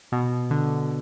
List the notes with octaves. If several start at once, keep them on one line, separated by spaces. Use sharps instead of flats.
B2
D3